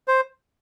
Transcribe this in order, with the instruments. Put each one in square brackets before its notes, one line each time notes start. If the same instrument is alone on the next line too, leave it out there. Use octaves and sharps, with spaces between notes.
[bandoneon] C5